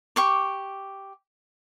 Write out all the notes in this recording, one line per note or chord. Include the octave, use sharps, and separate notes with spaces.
G4 C#6 D6